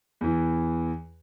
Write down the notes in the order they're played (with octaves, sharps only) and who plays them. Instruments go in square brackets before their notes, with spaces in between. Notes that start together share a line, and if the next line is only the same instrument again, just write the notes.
[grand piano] E2 E3